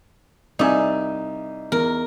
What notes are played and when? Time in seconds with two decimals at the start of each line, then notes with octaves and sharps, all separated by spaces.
0.59 C2 D#4 D5 E5 G#5
1.72 E2 A#4